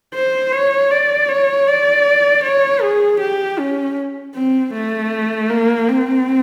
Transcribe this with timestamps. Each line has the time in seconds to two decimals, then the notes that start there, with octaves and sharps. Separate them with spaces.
0.14 C5
0.53 C#5
0.91 D5
1.29 C#5
1.67 D5
2.44 C#5
2.82 G#4
3.20 G4
3.58 C#4
4.35 C4
4.73 A3
5.50 A#3
5.88 C4